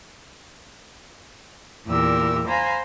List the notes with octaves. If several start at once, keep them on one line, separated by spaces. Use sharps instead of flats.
E2 A#2 E3 G4 A#4 E6
C5 F5 G#5 A#5 B5